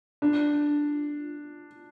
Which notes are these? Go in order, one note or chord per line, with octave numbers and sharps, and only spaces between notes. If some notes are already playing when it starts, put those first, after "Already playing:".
D4